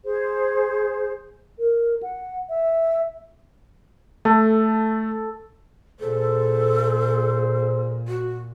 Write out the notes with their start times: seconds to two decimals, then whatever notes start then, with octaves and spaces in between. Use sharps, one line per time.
0.05 G#4 C5
1.59 A#4
2.03 F#5
2.49 E5
4.25 A3 A4
6.00 A#2 G#4 A4 C5
8.08 F#4